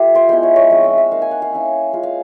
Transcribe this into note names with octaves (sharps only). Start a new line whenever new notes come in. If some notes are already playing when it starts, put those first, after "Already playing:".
Already playing: A3 F4 G4
C5
G#3 B3 E4 C5
C#5
C#5
F3 G#3 C4 D#4 D#5
E5
E5
A#3 D#4 F5
G#5
F#5
F5
A#3 C#4 E4
G#3 C#4 F4
F5